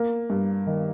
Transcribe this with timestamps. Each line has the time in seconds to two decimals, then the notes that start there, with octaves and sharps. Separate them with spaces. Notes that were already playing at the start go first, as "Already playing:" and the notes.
Already playing: A#3
0.30 G2
0.67 D#3